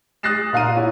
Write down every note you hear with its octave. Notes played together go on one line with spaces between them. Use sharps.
D#6 F#6 A6 A#6 C7 E7
A#2 F5 A#5 D#7
E4 C#5